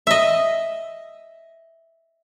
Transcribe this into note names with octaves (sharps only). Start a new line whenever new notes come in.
D#5 E5